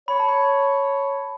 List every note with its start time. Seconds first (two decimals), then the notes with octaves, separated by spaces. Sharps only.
0.08 C#5 B5
0.20 A5
0.29 B5